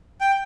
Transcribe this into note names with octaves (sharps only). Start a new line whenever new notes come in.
G5